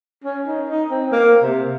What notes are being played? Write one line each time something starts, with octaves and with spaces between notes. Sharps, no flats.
C#4
D#4
D#4
C4
A#3
C3